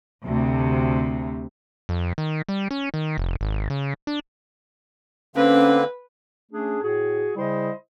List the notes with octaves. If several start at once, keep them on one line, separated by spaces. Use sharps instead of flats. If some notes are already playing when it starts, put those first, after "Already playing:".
D2 C3
F2
D#3
G3
C#4
D#3
F1
G#1
C#3
D4
D3 A#3 C4 C#4 B4
A3 C#4 D4 G#4
A2 F#4 G#4
C#3 G3 E4 C5 D#5